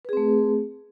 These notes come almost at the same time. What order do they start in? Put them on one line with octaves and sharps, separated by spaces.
B4 G#4 C4 A3